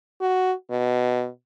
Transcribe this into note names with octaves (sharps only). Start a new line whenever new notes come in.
F#4
B2